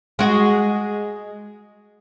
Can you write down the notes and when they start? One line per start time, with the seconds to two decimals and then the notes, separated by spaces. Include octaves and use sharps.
0.19 G#3 F#4